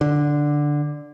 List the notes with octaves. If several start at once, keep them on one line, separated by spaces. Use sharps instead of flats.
D3